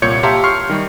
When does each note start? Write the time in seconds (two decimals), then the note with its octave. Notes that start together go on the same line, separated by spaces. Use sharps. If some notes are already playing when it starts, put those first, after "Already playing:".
0.02 C2 A#2 C#5 G6 G#6 C#7
0.23 G4 E5 F5 A5 A#5 C6
0.44 C6 C#6 F6 C7
0.69 D#3 G3